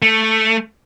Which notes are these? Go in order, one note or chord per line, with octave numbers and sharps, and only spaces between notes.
A3